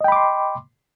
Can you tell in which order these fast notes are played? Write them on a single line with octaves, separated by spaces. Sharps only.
D#5 G5 B5 D6 C6